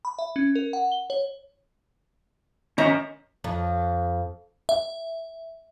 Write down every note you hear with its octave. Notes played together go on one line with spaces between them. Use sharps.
B5
E5
C#4
A#4
F#5
G7
C#5
D#3 C#4 F#4 E5 A#5
F2
E5